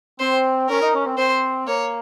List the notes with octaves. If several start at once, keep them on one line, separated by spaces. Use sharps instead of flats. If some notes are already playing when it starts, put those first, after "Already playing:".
C4 C5
C#4 A#4
D#4
C#4
C4
C4 C5
A#3 C#5